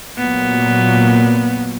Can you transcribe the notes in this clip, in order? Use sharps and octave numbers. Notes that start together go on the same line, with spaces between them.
A#2 F#3 B3